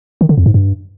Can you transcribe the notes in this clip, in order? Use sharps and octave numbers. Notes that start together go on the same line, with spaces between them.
D#3
D3
F2
G#2
G2